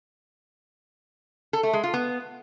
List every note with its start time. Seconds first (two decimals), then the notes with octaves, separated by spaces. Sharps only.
1.53 A4
1.63 A3
1.73 G#3
1.83 F4
1.94 B3